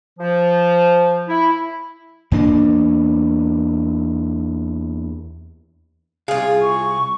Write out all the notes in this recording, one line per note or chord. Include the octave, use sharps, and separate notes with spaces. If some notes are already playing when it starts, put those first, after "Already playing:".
F3
E4
E2 A#3 D4
C2 F4 G#4 F5
C#6